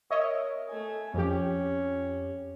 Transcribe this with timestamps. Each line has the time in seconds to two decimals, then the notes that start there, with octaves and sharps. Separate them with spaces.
0.10 A#4 C#5 D#5 E5
0.68 A3 G#5
1.14 F2 C#4 G4